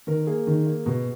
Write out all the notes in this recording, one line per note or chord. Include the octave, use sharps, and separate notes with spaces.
D#3 A#4
A#3 G#4
D#3
A#3
B2